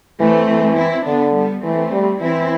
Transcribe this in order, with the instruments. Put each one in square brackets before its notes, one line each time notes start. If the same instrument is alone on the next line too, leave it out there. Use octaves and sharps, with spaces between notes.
[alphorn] E3 [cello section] A3 C4
[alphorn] E3
[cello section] C4 E4
[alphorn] D3 [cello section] B3 D4
[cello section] G3 B3
[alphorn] E3 [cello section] A3 C4
[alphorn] G3
[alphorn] E3 [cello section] C4 E4